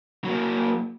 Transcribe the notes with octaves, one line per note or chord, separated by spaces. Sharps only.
F#3 A#3